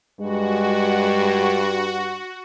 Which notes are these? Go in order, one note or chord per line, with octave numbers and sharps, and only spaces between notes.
G2 G#3 F#4